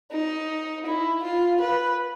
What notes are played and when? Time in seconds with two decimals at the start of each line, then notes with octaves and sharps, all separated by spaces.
0.11 D#4
0.85 E4
1.22 F4
1.60 B4